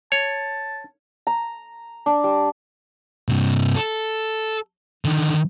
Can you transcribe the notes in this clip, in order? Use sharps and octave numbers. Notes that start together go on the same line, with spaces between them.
C#5 A5
A#5
D4
G3
G2 C3
A4
D3 D#3